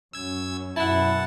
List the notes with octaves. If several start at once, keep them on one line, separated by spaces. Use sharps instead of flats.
F#2 C#4 E6 G#6
F#2 B2 E4 F#5 A5